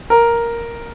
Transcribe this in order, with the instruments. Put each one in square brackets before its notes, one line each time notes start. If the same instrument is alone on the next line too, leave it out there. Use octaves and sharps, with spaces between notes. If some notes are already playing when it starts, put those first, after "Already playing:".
[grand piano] A#4